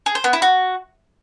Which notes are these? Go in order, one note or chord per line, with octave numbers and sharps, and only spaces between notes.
G#4
C5
B3
E4
F#4